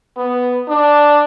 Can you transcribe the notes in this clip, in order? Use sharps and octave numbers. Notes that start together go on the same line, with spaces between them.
B3
D4